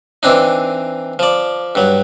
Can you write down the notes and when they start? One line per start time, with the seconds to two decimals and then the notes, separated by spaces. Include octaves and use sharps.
0.23 E3 C4 D4 D#4
1.19 F3 D5
1.75 G2 F#3